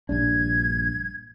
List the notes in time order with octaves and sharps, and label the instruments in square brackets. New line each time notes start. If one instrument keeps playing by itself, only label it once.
[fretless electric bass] A#1 G2 D4 [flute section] G#6